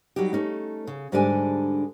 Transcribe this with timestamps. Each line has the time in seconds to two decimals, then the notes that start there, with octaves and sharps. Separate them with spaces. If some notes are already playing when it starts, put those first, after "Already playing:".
0.16 F#3 G3 D#4 G4
0.33 A3 C#4 D#4
0.87 C#3
1.12 G#2 D3 G3 D4 D5 G#5